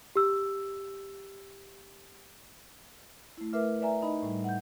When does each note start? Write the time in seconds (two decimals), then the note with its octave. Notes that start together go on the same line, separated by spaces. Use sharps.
0.16 G4 E6
3.38 A3 E4
3.53 A3 A#4 B4 E5 D6 F6
3.81 B4 D5 E5 G#5 A#5
4.02 D#4 D#5 B5
4.22 A2 G3
4.44 F#5 G6